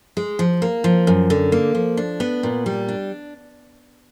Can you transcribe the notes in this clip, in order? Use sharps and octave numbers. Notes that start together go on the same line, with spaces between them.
G#3
F3
A#3
F3
F#2
D3
A#3
F3
D4
B3
A#2
G3
D4